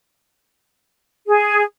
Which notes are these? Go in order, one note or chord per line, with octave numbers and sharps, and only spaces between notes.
G#4